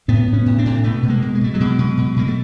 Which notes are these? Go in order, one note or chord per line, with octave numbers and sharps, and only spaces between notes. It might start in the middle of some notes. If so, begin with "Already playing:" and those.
A2 A3 B3
A2
B3 C#4
A2
C4 D4
A2
B2 A3 B3
B2
G#3 A#3
B2
G#3
B2 A3
F#3 G#3
B2
B2
B2
B2 A#3
A3